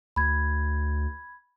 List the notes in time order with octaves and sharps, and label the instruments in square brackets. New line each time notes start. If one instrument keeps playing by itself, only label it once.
[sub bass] D2 [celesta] B5 G#6